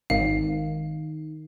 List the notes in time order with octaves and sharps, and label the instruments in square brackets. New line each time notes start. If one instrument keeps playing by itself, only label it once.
[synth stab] G#1 [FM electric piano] D#3 [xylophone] F5